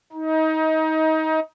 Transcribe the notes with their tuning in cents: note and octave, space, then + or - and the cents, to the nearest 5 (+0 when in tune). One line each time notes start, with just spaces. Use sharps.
D#4 +25